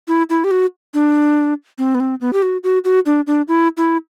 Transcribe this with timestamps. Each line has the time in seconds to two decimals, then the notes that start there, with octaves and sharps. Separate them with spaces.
0.08 E4
0.30 E4
0.44 G4
0.51 F#4
0.94 D4
1.78 C4
1.95 B3
2.00 C4
2.21 B3
2.33 G4
2.42 F#4
2.63 F#4
2.85 F#4
3.06 D4
3.27 D4
3.48 E4
3.77 E4